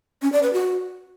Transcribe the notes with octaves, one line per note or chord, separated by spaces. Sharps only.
C#4
D5
B4
F#4